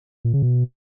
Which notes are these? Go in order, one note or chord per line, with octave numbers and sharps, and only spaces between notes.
A#2
C#3
B2